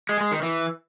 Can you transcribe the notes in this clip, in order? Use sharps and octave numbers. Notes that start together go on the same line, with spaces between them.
G#3
G#3
D#3
E3